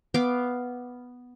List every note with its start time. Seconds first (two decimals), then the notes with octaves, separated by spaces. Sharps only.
0.14 B3 F5 D6